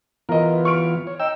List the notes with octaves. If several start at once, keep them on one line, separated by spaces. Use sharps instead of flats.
E3 B3 F4 A#4 D#5
C#6 F6 D7
C#5
D#4 G5 E6